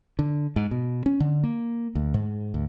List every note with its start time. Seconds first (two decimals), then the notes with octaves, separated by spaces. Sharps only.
0.19 D3
0.56 G#2
0.71 B2
1.06 C#4
1.20 D3
1.44 A#3
1.95 D2
2.14 G#2
2.54 D2